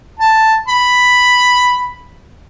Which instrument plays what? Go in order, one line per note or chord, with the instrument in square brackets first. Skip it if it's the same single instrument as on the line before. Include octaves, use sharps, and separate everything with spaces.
[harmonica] A5
B5